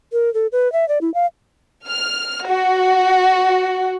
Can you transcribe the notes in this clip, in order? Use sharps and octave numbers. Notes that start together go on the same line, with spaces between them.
A#4
A4
B4
E5
D5
E4
F5
F6
F#4